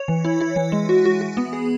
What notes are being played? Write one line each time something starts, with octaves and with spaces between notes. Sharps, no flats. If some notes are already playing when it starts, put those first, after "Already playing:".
Already playing: C#5
E3
E4
E4
E3
G#3
F#4
F#4
F#4
B3
G#4